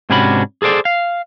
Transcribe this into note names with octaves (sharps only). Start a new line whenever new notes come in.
G#2 C3 C#4 D4 F#4 B5
G#4 A4 C5 D5
F5